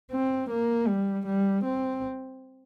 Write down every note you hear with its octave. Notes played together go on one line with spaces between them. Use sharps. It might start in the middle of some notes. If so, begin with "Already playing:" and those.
C4
A#3
G3
G3
C4